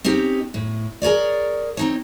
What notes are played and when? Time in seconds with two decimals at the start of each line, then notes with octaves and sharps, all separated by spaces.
0.04 C4 C#4 D#4 G4
0.54 A2
1.02 G#4 A#4 C#5 D5
1.77 C4 D#4 C#5